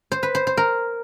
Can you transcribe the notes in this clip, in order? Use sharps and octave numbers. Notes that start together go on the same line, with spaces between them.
C5
B4
C5
C5
A#4